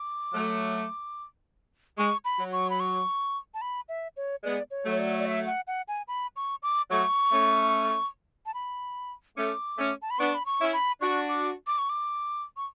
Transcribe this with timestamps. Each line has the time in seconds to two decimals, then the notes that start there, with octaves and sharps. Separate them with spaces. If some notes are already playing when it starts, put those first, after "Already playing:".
Already playing: D6
0.33 F#3 A3
1.98 G#3 C#6
2.25 B5
2.39 F#3
2.52 C#6
2.70 B5
2.80 C#6
3.54 A5
3.62 B5
3.89 E5
4.17 C#5
4.44 G#3 B3 D5
4.71 C#5
4.85 F#3 A3
4.91 C#5
4.99 D5
5.18 D5
5.26 E5
5.47 F#5
5.67 F#5
5.88 G#5
6.08 B5
6.36 C#6
6.63 D6
6.90 F#3 A3 C#6
7.31 A3 C#4
8.46 A5
8.54 B5
9.37 A3 C#4 D6
9.78 A3 C#4
10.02 A5
10.11 B5
10.19 B3 D4 C#6
10.34 B5
10.46 C#6
10.60 C#4 E4
10.73 B5
11.01 D4 F#4 C#6
11.29 D6
11.67 D6
11.78 C#6
11.90 D6
12.57 C#6